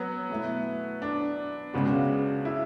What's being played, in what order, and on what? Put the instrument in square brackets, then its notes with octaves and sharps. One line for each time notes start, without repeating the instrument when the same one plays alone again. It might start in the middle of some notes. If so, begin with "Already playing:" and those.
Already playing: [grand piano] F#3 B3
[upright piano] B2 A3 E4
[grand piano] D4
[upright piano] C#2 C#3 G#3 B3 F#4
[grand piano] E4